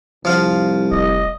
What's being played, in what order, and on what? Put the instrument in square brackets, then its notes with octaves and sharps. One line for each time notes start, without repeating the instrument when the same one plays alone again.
[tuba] C2 [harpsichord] F3 F5
[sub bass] F1 [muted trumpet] D#5